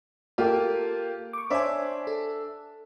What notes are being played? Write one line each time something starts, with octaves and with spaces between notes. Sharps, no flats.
A#3 F4 G4 A4
C#6 D6
D4 C5 C#5 E5 G#5 D6
A4